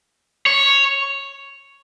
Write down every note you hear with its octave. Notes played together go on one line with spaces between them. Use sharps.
C#5